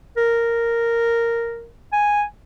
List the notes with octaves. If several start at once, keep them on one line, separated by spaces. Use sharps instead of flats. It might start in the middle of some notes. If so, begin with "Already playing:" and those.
A#4
G#5